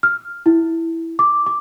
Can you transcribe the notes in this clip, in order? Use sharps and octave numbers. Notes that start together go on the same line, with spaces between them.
F6
E4
D6
D6